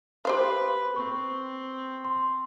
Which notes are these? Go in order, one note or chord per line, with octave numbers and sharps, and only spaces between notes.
G4 B4 C5 F5
C4 C#6
C6